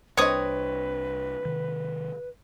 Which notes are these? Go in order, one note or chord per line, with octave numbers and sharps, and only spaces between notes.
C2 G3 C4 D4 B4 C#5 D#5 D#6
C3 D#3